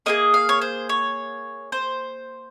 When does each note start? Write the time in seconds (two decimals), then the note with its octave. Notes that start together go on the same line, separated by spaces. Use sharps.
0.06 A#3 F4 G#4 D#5
0.34 F5
0.49 C#5
0.61 C5
0.89 C#5
1.72 C5